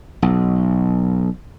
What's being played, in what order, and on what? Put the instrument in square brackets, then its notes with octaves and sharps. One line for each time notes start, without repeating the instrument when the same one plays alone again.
[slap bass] B1